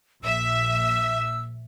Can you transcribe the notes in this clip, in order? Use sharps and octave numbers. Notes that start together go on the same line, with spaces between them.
A#1 E5 E6